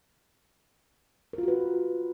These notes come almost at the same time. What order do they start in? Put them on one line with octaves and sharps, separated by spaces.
A#4 F4 F#4 B4